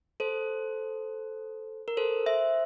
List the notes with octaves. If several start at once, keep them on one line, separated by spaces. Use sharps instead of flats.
A4 C5
A#4
A4 C5
C5 E5